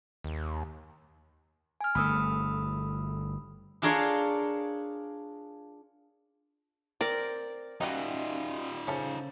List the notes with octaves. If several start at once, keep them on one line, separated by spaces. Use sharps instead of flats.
D#2
G#5 F6
G1 A3 B5 D#6 E6
D4 F4 G#4 A#4 C#5 F5
C4 A#4 D5
D#3 G3 C#4 D#4 F4 F#4 D#5
C#3 C#4 A4 C5 F5